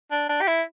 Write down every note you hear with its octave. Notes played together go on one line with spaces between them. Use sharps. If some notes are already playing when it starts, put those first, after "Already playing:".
D4
D4
G4
E4